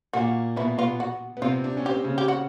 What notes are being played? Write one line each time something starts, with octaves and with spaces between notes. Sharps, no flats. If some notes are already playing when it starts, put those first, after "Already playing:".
A#2 A#3 F#4
B2 B3 E4
B2 B3 F4
F#4
B3
C3 C4 F4
D4
C#4
G4
C4
C#3 C#4
G4
F#4